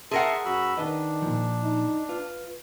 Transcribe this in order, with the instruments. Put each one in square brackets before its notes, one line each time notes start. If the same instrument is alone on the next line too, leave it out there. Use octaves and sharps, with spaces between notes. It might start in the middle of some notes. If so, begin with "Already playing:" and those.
[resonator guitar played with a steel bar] G#4 A#4 F#5 [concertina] E5 A5 C6
[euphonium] F#2 [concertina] F#4 B5 E6
[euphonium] D#3 [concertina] D4 [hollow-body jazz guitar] B4 D#5
[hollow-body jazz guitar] A#2 F3
[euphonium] D#4
[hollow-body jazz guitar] F4 [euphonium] B4